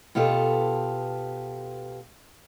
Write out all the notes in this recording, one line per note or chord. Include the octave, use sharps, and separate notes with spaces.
B2 B3 F4 G4 A4